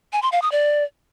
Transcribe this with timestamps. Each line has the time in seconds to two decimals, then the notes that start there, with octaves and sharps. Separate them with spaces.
0.13 G#5
0.22 C6
0.32 F5
0.42 D#6
0.52 D5